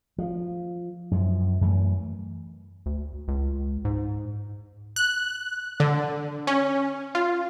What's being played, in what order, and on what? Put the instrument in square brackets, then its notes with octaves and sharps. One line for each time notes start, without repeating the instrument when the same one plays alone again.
[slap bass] F3
F#2 F3
F#2 E3 A3
[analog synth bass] D2
C#2
G#2
[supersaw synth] F#6
D3
C#4
F4